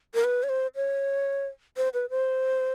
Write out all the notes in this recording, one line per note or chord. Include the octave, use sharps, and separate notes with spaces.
A#4
B4
C#5
C5
C#5
C5
B4
C5